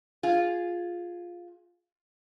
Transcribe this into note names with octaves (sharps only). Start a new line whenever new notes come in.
F4 G#4